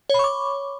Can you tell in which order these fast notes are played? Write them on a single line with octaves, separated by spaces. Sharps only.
C#5 B5 C#6 D6